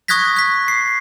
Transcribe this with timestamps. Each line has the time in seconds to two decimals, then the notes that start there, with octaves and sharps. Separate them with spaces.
0.08 C#6 D#6 F#6 G#6 A#6 B6
0.37 F#6 B6
0.68 C7